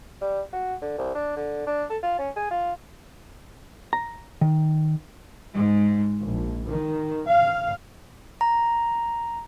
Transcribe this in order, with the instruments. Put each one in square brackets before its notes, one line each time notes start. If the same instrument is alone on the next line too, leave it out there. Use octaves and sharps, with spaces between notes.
[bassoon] G3
F#4
D3
C2
D4
D3
D4
A4
F4
C#4
G#4
F4
[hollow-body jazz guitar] A#5
D#3
[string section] G#2
A#1
D#3
F5
[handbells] A#5